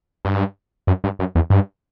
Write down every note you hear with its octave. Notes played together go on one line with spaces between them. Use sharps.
G2
F#2
G2
F#2
E2
G2